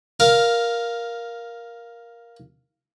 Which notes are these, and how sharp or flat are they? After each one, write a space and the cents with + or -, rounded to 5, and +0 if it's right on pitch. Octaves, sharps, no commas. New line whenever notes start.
A#4 +10 F5 +0